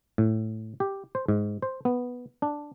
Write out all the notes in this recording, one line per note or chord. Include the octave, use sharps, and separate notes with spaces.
A2
G4
C5
G#2
C5
B3
D4